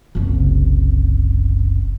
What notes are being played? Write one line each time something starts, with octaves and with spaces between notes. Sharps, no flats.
F#1 C2